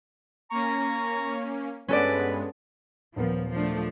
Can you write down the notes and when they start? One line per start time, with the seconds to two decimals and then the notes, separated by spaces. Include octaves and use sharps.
0.51 A#3 C#4 A#5 C#6
1.88 G2 G#3 B3 C#4 A4 B4 D5
3.16 D#1 F3 B3 A#4
3.52 F3 A3 D4